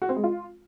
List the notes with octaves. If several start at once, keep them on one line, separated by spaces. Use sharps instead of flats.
F#4
C4
G#3
F4